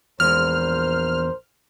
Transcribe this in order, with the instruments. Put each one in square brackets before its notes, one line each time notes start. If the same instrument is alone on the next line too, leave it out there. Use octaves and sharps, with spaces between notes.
[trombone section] A#1 A#4 C5 [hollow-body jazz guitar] E2 G#3 [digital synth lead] F6